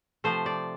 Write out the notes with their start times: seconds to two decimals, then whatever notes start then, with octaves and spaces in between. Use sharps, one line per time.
0.24 C3 F3 A3 C5
0.46 D5